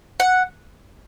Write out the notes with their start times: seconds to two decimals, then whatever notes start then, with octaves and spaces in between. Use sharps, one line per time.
0.20 F#5